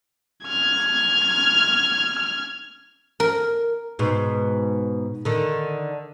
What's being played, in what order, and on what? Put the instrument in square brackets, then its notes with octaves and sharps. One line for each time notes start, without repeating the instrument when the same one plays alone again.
[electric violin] F6 G#6
[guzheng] A#4
[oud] G#2 B2
D3 D#3